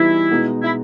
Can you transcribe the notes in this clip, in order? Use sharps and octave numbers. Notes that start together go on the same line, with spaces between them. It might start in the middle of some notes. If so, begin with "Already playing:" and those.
Already playing: E3 G3 B3 D#4 E4 F#4
B2 G#3 B3 D#4
E4